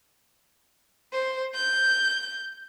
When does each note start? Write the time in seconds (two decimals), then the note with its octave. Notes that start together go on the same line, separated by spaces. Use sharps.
1.13 C5
1.55 G6